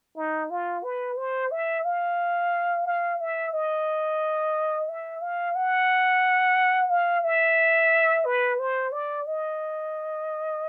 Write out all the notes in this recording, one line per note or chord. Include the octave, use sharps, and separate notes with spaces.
D#4
F4
B4
C5
E5
F5
F5
E5
D#5
E5
F5
F#5
F5
E5
B4
C5
D5
D#5